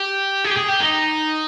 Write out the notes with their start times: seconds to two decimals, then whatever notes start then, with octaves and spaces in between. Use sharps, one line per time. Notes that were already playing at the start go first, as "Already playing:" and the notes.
Already playing: G4
0.44 G#4
0.50 G4
0.56 G#4
0.68 G4
0.80 D#4